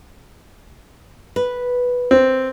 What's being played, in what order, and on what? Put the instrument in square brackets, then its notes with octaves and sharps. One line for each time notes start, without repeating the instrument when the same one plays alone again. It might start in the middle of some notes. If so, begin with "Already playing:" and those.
[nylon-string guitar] B4
[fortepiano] C4